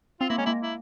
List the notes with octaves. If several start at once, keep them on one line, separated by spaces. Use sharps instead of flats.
C4 F4
A#3 E4
G#3 C#4
A#3 E4
E4